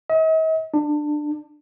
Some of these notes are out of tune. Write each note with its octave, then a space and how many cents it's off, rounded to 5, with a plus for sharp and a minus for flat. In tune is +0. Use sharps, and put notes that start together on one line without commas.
D#5 +45
D4 +20